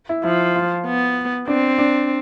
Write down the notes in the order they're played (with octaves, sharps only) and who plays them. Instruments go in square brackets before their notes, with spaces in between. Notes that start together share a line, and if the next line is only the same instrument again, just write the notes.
[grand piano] E4
[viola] F3 [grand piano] E4
[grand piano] F4
[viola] B3
[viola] C4 [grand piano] D4
[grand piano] D4